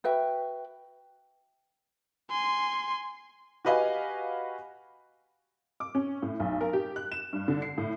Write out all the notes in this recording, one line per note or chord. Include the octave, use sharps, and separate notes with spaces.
F#4 B4 E5 G5
G#5 C6
F#4 G4 B4 D#5 F5 G#5
D6
C#4
A2
B1
A#4
G4
F#6
E7
G2
D3
C7
A2